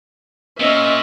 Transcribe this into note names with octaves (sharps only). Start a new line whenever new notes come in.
A#2 C#4 D#5 E5